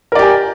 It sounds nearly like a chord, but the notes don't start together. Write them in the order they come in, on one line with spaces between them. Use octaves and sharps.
A#4 D5 G4 G#5